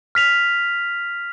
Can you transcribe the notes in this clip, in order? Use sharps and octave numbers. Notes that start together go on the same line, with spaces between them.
F6 B6 F7